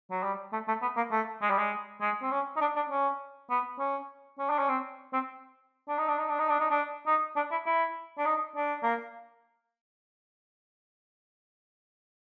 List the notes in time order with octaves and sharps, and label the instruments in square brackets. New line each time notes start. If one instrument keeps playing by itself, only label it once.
[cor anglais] F#3
G3
A3
A3
B3
A#3
A3
G#3
G3
G#3
G#3
C4
C#4
D#4
D4
D4
C#4
B3
C#4
C#4
D4
C#4
C4
C4
D4
D#4
D4
D#4
D4
D#4
D4
D#4
D4
D#4
D4
E4
E4
D4
D#4
D4
A#3